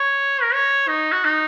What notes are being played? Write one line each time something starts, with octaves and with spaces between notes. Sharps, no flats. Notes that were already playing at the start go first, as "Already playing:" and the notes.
Already playing: C#5
A#4
C#5
D#4
F#4
D#4